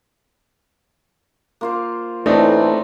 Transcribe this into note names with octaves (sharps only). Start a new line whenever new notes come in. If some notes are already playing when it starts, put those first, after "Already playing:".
A#3 F4 C5
A2 E3 A3 C4 D4 D#4 A#5